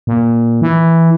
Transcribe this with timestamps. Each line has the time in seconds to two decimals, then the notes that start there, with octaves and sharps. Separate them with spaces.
0.07 A#2
0.62 E3